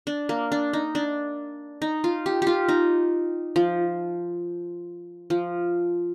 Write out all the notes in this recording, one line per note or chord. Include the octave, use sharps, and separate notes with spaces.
D4
A#3
D4
D#4
D4
D#4
F4
G4
F4 G4
D#4
F3
F3